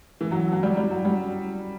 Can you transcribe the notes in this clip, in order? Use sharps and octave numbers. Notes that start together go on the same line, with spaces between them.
E3
F#3
F#3
G3
G3
F#3
G3